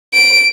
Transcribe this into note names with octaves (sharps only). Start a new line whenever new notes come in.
D7